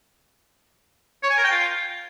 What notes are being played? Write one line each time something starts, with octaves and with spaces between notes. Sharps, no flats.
C#5
G#5
A#4
G5
F4